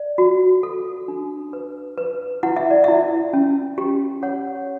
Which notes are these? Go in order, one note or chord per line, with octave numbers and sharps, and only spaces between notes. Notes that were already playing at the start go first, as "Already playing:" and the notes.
Already playing: D5
F#4
A4
D4
B4
B4
E4 F#5
E5
D5
E4 E5
C#4
G4
C#5 F#5